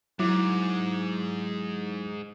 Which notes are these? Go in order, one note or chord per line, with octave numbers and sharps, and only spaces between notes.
G#2 F#3 E4 D6